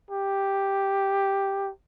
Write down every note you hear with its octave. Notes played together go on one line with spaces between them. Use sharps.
G4